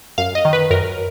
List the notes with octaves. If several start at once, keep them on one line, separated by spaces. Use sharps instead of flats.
F#2 F5
D#5
D#3
B4
F#2 A#4